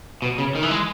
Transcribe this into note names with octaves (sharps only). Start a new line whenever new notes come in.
B2
C#3
D#3
E3
G#3